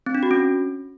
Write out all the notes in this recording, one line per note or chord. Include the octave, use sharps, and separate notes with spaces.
C4
D4
F#4
C#4